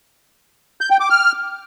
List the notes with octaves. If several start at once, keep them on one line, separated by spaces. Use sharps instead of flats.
G6
G5
D6
F6